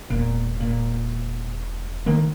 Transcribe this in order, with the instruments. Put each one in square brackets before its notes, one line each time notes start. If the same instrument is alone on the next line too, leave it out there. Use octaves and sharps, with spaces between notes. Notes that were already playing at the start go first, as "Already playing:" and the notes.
[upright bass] E1 [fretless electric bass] A#2
[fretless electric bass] A#2
D3 D#3 A#3